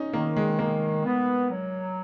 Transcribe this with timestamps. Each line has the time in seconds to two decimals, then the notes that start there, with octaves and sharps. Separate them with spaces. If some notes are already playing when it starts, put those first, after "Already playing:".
Already playing: C#4 D#4
0.13 D#3 A#3
0.37 G#3
0.59 D#3 A#3
1.05 B3
1.50 F#3